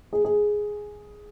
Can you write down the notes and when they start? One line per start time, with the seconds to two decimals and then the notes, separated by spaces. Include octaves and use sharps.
0.13 G#4
0.25 G#4